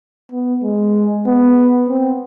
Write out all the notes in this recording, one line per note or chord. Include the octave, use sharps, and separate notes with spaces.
B3
G#3
B3
C4